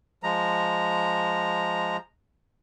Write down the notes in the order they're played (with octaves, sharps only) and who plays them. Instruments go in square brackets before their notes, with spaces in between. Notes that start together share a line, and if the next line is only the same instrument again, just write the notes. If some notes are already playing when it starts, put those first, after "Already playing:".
[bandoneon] F3 G#3 A#5